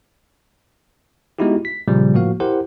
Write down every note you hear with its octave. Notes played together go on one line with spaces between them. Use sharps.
G#3 B3 D#4 E4 F#4 G4
B6
A#2 C#3 F3 G3
A2 F3 A#3 F#4 F5
E4 G4 A#4 C5 F#5